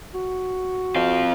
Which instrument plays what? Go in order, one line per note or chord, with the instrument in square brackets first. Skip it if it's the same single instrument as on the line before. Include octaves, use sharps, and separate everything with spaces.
[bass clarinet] F#4
[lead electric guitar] C4 F4